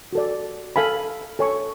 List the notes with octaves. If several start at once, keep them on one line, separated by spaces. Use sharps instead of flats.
F#4 A4 D5
A4 F5 G#5 B5
A4 C#5 G#5 C#6